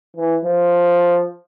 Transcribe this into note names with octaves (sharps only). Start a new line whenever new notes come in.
E3
F3